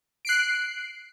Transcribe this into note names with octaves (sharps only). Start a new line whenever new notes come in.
F#6 C7 D7